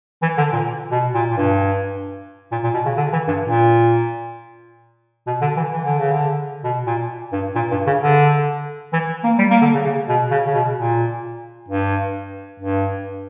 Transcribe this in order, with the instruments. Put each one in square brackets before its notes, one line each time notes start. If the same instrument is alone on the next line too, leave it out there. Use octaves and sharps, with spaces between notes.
[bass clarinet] E3
D3
A#2
B2
A#2
A#2
G2
A#2
A#2
B2
C#3
D3
E3
G2
A#2
B2
D3
E3
E3
D3
C#3
D3
B2
A#2
G2
A#2
G2
C#3
D3
E3
A#3
G3
A#3
D3
C#3
C#3
B2
C#3
C#3
B2
A#2
G2
G2